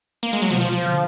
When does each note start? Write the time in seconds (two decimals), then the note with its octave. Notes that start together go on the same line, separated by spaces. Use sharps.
0.23 A#3
0.33 G#3
0.42 F#3
0.50 B2 F3
0.61 F3
0.73 F3
0.84 D3